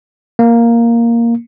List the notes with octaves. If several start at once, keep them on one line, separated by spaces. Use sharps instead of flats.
A#3